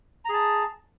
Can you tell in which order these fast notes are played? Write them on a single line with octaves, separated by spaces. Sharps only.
A#5 G#4 A5